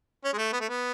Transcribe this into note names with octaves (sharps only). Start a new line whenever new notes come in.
C#4
G#3
A3
B3
A3
B3